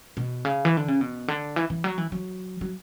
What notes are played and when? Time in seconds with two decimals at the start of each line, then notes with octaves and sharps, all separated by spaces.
0.17 B2
0.45 C#3
0.65 E3
0.77 D3
0.88 C#3
1.01 B2
1.28 D3
1.56 E3
1.70 E3
1.84 F#3
1.98 E3
2.12 F#3
2.61 F#3